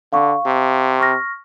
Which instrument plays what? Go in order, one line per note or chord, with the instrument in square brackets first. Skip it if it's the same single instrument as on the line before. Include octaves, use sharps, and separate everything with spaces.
[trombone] D3 [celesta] F5 C#6
[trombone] C3
[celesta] C#6 F6 A#6